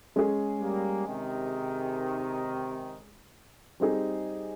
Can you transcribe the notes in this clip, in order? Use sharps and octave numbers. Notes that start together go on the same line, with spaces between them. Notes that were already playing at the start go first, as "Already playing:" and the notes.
G#3 C#4 G#4
G3 A#3
C3 D#3
G3 C4 D#4 G#4